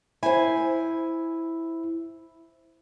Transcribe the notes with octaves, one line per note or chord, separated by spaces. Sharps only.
E4 C5 G#5